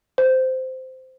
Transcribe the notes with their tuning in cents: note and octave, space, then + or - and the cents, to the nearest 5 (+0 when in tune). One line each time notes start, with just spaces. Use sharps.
C5 -15